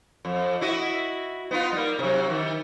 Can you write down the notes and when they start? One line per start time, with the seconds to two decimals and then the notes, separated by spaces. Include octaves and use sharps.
0.25 F2
0.61 E4 F#4 D#5
1.51 B3 D#4 F4
1.72 G3 A#3
1.99 C3 F#3
2.30 D#3